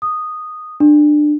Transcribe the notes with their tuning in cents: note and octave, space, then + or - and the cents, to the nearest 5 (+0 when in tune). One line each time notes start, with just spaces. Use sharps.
D#6 -10
D4 +20